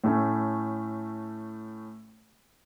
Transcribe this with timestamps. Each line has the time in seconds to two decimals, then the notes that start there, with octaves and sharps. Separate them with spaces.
0.04 A2 A3 C#4